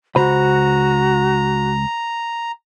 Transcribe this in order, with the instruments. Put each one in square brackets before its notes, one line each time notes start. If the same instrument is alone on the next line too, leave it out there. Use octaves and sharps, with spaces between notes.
[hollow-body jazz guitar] C#2 C5 B5 [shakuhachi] F#4 [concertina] A#5